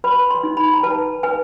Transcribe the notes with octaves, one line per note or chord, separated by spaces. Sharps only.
B4 B5
C6
D#4
B5
A#5
B4 A5
B4 G#5